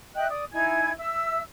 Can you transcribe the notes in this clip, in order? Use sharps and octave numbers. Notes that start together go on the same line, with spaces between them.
D#5 E5 G5 F#6
D5 D#6
D#4 E4 G#5 G#6
E5 E6